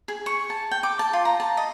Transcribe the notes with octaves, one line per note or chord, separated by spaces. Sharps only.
G#4
C#6
A5
G5
D6
A5
F4
A#5
A5
D#5